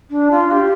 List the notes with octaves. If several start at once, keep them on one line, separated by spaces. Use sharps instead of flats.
D4
F4
G4